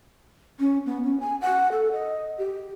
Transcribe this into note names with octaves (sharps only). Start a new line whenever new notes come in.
C#4
B3
C#4
G#5
F#5
A4
D#5
G4